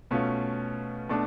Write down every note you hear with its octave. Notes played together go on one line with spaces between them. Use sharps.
B2 A3 C#4 F4
B2 A3 D4